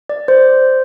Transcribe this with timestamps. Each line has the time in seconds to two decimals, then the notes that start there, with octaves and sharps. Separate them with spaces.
0.09 D5
0.28 C5